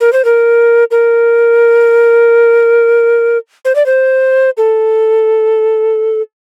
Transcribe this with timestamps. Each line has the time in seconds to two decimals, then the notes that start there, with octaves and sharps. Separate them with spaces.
0.01 A#4
0.13 C5
0.25 A#4
0.91 A#4
3.65 C5
3.75 D5
3.86 C5
4.57 A4